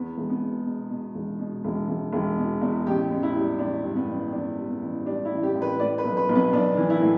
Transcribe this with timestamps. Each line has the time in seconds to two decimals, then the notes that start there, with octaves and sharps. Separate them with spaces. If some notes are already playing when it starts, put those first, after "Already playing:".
Already playing: E2 B3
0.17 E1
0.30 B3
0.42 B2
0.65 B2
0.90 B2
1.15 E1
1.39 B2
1.64 E1
1.88 E1
2.13 E1
2.38 B2
2.61 E2
2.87 A1 G4
3.11 A1
3.23 E4
3.35 G3
3.59 A1 D4
3.84 G2
3.96 B3
4.08 A1
4.32 A1 D4
4.58 G3
4.69 B3
4.82 A1
5.06 G3 D4
5.25 E4
5.31 A1
5.43 G4
5.55 A1
5.62 B4
5.80 A2 D5
5.98 B4
6.05 B1
6.17 B4
6.29 B1
6.35 B3
6.53 B1 D4
6.77 E3
6.90 E4
7.01 A2